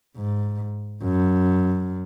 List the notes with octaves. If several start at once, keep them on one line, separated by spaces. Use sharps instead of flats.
G#2
F#2